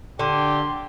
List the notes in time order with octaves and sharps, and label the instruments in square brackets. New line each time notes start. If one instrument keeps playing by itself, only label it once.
[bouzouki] D3 [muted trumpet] G4 [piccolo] C6